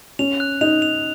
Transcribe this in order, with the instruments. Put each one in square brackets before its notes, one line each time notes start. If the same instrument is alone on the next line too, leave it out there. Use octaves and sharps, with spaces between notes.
[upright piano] C#4 [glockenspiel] F7
[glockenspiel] F#6
[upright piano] D#4 [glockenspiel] F7
[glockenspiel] F7